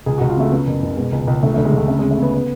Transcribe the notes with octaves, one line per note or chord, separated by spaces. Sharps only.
C#2 G#4
F#4
C#2
F4
C#3 A3
C#3 B3
F#1
F#1
B2 G#3
C#2
C#2
D2 A3
A3
D2
G#3
D2 A3
C#3 A3
G#3
C#3
A3
C#3 B3
B3